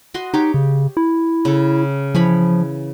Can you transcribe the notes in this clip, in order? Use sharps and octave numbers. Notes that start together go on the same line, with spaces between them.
F#4 D#5 C6
D#4 G4 C#5
C#3
E4
C#3 A4
E3 F3 C#5 B5